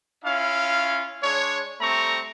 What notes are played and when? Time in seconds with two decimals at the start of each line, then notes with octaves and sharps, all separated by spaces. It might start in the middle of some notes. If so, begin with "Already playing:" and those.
0.25 C#4 E4 F4 F5
1.22 G#3 D4 C#5
1.80 G3 A3 C4 A#5 C#6